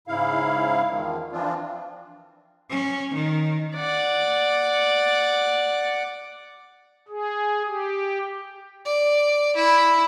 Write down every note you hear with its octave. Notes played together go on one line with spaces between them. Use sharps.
G#2 C#3 E4 F5
E2 D#3 F3
E3 F3 C4 D4 F4
C#4
D#3
D5 F#5
G#4
G4
D5
E4